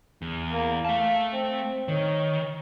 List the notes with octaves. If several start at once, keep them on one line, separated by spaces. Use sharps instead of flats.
E2
A#3
A3 F5 A5
C4
D#3 C#5